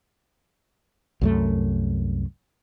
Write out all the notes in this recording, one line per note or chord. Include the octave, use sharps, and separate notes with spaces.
C2 F#2 A3